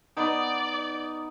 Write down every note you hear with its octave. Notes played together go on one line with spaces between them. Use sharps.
B3 D#4 D5